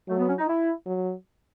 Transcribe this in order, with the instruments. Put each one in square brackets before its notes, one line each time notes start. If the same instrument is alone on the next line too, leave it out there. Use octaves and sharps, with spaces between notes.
[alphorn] F#3 [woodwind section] A3
[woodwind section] B3
C#4
D#4
E4
[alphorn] F#3